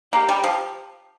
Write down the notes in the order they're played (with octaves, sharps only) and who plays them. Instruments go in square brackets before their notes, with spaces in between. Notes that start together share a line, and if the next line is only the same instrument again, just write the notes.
[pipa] A#3 [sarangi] G4
[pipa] G3
F3